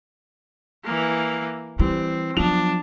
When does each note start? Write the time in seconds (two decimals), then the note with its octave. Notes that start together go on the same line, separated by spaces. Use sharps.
0.84 E3 A#3
1.79 E3 G3 C4
2.37 F3 F#3 B3 D4 F7